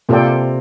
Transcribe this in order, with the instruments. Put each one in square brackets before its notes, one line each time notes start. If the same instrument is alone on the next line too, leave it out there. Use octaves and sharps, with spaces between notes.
[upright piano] C3 [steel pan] A#3 F4 A4 D5 G5